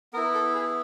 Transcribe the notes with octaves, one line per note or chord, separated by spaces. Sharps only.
B3 E4 A#4
A4
G#4